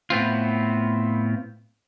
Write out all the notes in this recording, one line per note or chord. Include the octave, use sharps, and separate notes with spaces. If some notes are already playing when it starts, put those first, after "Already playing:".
A2 B3 C4 F4